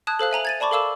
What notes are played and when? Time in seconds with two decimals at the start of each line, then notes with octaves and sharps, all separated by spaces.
0.07 A5 D#6 F#6 G#6
0.19 A4 C5 F5 F#6
0.31 E5 G#5 A#5 F#7
0.45 G#6 A6 D#7
0.60 D5 A5 B5 C#6 D6
0.71 A4 A#4 F5 D6 E6 E7